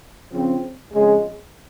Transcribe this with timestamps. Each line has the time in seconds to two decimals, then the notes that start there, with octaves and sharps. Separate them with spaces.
0.32 C#3 F3 C4
0.93 F2 C#3 G#3